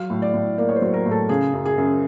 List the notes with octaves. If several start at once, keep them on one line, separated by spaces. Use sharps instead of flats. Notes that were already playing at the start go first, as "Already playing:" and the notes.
Already playing: F#3 F5
A2
D5
A2
A#3 D5
C#5
C5
F#3
A#4
A2
A4
C#3 G#4
F#2
G#4
F#2